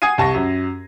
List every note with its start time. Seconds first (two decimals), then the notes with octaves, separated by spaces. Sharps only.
0.02 F#5 G#5 D#6 G#6 C7 D#7
0.18 C2 A5 C#6 A#6
0.34 F#2